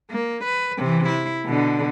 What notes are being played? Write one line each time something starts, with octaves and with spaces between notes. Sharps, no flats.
A#3
B4
C3 E3
E4
B2 D3